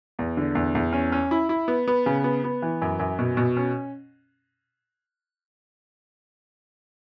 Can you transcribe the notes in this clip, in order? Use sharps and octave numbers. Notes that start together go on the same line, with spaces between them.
E2
D3
E2
E2
C#4
C#4
E4
E4
B3
B3
C#3
B3
B3
E3
F#2
F#2
B2
B2
C#4